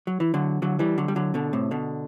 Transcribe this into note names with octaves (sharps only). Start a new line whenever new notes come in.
F#3
E3
D3 F#3
D3 F#3
E3 G3
D3 F#3
G3
D3 F#3
B2 D3
A2 C3
B2 D3